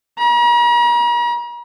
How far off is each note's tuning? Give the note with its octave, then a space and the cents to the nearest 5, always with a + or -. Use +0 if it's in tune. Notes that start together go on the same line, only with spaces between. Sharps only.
A#5 +45